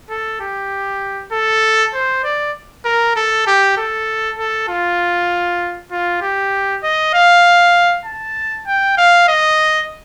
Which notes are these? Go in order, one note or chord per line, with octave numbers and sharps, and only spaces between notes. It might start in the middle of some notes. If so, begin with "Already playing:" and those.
A4
G4
A4
C5
D5
A#4
A4
G4
A4
A4
F4
F4
G4
D#5
F5
A5
G5
F5
D#5